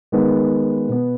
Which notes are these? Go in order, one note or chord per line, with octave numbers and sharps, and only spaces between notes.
D#3 G#3 B3
B2 B3